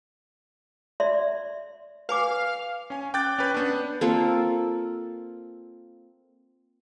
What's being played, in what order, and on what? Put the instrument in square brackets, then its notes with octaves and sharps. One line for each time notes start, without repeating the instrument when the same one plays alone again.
[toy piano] D5 E5 C6
[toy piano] B4 G#5 D6 [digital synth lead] F5
[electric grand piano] C#4 G#5
G5 D6 F#6 G6 A6
C#4 B4
B3 D4
[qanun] A#3 C4 F4 A4